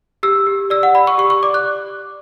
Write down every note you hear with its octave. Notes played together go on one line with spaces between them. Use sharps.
G4 E6
G4
D5 E6
F#5
D5 B5
C#6
G4 C#6
C#6
D5 D6
F#6